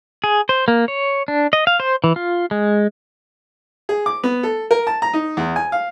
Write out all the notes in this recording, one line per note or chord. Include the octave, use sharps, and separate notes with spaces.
G#4
C5
A#3
C#5
D4
D#5
F5
C5
E3
F4
G#3
G#4
D6
B3
A4
A#4
A5
A#5
D#4
E2
G#5
F5